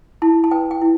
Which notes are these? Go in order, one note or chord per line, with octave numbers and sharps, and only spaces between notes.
E4 A5
A5
B4 G5
G5
E4